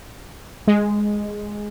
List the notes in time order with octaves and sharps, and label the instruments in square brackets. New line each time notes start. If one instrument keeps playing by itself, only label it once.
[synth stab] G#3